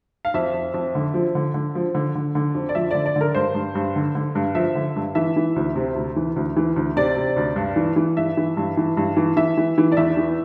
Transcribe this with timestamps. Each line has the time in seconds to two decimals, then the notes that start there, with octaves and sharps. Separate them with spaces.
0.25 F5
0.34 F2 E5
0.54 F2
0.74 F2
0.95 D3
1.14 F3
1.35 D3
1.54 D3
1.75 F3
1.95 D3
2.15 D3
2.35 D3
2.55 F2
2.69 D5
2.75 F3 E5
2.91 D3 D5
3.06 D5
3.16 D3
3.21 A#4
3.35 G2 C5
3.55 G2
3.75 G2
3.96 D3
4.15 D3
4.35 G2
4.55 F3 E5
4.75 D3
4.96 G2
5.15 E3 E5
5.36 E3
5.56 D2
5.76 C3
5.96 D2
6.16 E3
6.36 D2
6.57 E3
6.76 D2
6.97 C3 D5
7.16 C3
7.36 D2
7.56 G2
7.76 E3
7.96 E3
8.17 G2 E5
8.37 E3
8.57 G2
8.77 E3
8.97 G2
9.17 E3
9.36 E3 E5
9.57 E3
9.78 E3
9.92 D5
9.97 E2 E5
10.17 E3